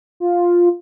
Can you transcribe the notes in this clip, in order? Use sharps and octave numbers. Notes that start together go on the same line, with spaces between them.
F4